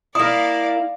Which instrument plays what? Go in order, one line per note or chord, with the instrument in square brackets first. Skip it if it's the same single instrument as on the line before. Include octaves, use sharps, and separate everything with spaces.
[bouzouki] A#3 E4 [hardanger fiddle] D5 F5 [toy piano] D#6